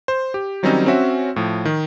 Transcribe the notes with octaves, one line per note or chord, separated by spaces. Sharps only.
C5
G4
D#3 F#3 G3 C4 C#4 D#4
C4 C#4 F#4 E5
A2 F3
D#3